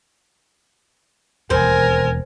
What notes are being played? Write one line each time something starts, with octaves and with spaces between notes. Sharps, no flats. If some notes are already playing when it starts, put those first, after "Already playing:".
E1 D#2 C4 A#4 G#5